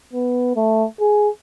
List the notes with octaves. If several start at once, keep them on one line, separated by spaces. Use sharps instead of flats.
B3
A3
G#4